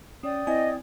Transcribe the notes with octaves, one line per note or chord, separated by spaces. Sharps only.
C#4 D5 G5 D#6
C4 E4 D#5 G#5